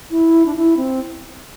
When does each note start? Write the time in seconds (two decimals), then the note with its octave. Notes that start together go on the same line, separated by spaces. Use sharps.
0.11 E4
0.46 D4
0.55 E4
0.77 C4